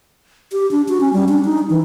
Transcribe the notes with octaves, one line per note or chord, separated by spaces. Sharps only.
G4
D4
F#4
C#4
G3
D4
D#4
E3